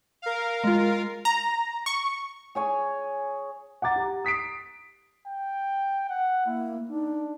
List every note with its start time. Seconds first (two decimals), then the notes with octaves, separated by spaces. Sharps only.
0.22 A#4 F5
0.64 G#3 F4
1.25 A#5
1.86 C#6
2.55 G#4 C#5 G#5
3.82 F#5 A#5 D6 A6
3.96 G4 A#5
4.25 D#6 B6 C7 D7
5.27 G5
6.10 F#5
6.46 A#3 E4
6.89 D4 D#4